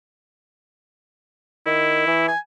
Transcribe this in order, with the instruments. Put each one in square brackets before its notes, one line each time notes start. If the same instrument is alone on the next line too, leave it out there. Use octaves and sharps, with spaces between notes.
[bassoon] D#3 [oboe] E4
[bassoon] E3
[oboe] G#5